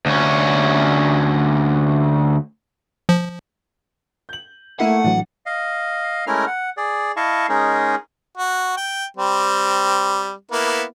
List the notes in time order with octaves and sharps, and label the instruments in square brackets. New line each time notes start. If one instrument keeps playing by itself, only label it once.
[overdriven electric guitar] D2 C#4
[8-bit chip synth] F3
[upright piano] G6 F#7
[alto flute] A3 [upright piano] A#3 E4 D#7 [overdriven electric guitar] F#5
[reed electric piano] A2 E3 F#3 [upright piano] D4
[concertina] D#5 F5
G#3 A3 C#4 E4 A#4 F6
F#5
G#4 D5
E4 D#5 F5 A5 C#6
G#3 C#4 D#4 G#4 A#4
[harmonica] F#4
G5
G3 C4
A#3 B3 E4